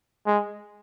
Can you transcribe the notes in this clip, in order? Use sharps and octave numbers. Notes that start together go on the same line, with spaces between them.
G#3